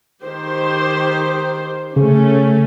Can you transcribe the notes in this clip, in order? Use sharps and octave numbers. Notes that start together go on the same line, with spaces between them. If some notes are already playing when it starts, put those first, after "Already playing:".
D#3 G4 C5
C#3 A3 C#4